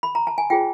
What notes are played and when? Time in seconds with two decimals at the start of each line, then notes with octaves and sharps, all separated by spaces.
0.03 B5
0.15 A#5
0.27 A5
0.38 G#5
0.50 F4 G#4 C5 G5